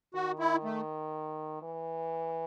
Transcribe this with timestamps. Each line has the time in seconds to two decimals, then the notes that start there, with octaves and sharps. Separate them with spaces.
0.14 D#3 F#4
0.39 E4
0.64 A3
1.62 E3